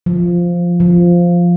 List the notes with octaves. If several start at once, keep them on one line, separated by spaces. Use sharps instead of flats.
F3
F3